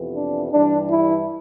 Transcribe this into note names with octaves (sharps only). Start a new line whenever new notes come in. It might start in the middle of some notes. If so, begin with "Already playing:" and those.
Already playing: F2 C3 E3 B3
D4
G2 E3 G3 D4
E4